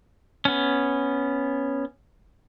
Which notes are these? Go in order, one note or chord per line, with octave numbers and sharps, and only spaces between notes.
B3 C#4